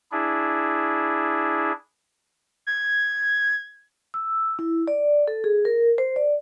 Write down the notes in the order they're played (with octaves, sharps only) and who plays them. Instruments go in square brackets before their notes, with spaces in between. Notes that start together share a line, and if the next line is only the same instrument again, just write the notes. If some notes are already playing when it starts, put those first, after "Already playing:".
[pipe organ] D4 E4 G#4
[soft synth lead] G#6
[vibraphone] E6
E4
D5
A4
G#4
A#4
C5
D5